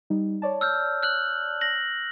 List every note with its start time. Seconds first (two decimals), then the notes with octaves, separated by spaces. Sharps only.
0.10 G3 D#4
0.42 C#5 D5 A5
0.61 E6 F6 G6
1.02 F6 F#6 F#7
1.61 A#6 F#7